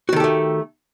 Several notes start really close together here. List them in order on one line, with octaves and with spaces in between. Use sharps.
F#4 D#3 A4 G4 A3